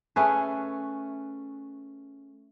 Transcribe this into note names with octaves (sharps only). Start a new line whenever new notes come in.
A3 C#4 G#4 B4